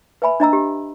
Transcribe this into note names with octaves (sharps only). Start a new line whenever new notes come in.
B4 E5 G#5 B5
D4 D#5 A#5 E6
G4